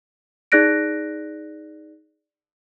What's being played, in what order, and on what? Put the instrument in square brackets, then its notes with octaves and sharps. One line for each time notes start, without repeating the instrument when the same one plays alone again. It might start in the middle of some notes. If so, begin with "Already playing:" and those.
[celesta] D#4 G#4 D5 F#6 A#6 D7